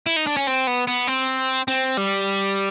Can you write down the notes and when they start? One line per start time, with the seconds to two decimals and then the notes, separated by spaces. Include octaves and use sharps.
0.06 E4
0.16 D#4
0.27 D4
0.37 C#4
0.47 C4
0.67 B3
0.87 B3
1.07 C4
1.68 C4
1.97 G3